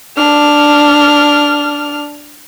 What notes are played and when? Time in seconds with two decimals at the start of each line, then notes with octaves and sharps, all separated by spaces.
0.17 D4 F6